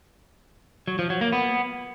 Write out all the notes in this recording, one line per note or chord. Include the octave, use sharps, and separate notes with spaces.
F#3
F3
F#3
A#3
B3